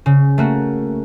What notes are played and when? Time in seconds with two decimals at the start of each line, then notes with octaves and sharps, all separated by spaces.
0.06 C#3
0.38 A3 A#3 F#4